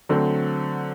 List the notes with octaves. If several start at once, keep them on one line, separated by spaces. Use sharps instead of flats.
D3 F#3 A3 C4